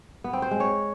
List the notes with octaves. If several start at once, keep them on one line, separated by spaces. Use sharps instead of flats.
B3
C4
C5
G#3
C#5